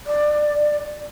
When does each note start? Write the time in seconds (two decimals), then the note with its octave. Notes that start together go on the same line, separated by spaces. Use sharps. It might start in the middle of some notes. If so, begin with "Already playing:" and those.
0.07 D5